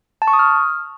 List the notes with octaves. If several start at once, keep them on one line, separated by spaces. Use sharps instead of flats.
A5
C#6
D#6
F6